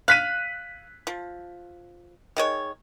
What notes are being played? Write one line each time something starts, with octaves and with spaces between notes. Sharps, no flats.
F5 F#6 B6 D#7
F3
D#3 G#3 C#5